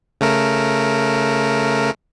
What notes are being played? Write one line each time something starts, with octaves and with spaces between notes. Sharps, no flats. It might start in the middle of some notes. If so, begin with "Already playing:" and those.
C#3 A3 A#4